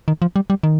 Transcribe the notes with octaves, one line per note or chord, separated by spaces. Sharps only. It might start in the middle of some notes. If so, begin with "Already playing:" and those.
D#3
F3
G3
G3
D#3